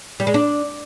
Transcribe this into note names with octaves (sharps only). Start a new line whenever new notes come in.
G3
G#3
D4